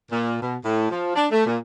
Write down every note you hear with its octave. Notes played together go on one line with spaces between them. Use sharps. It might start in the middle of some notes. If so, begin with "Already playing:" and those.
A#2
B2
A2
F3
D4
A3
A#2